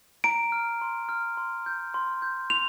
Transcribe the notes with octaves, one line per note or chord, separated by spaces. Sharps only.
A#5 D7
F6
C6
F6
C6
G6
C6
G6
C6 F7